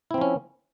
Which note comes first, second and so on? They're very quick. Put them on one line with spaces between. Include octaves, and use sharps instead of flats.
E4 C4 F3 C#4